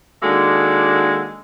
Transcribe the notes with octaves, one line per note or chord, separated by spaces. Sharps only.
D#3 G#3 A#3 D4 F#4 A4